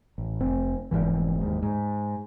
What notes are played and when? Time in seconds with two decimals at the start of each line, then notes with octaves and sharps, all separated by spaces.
0.18 A1
0.40 F1 C4
0.91 F1 B1 G#2 E3
1.41 D#2 G#2
1.63 G#2